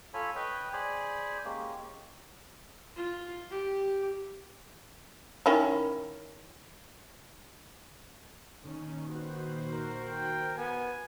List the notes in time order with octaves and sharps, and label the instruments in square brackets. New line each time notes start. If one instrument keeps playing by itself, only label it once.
[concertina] F4 A4 C#5 G#5 B5
B4 C#5 D#5 G5 B5
G#4 C5 D5 G#5 B5
G#3 A#3 C#4 G4
[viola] F4
G4
[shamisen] D#3 C#4 E4
[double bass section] A#2 D#3 [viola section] C#4
[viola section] F#4 C5 [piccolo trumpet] B4
[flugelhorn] A#4
[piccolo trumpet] G5
[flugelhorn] B3 [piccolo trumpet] G#5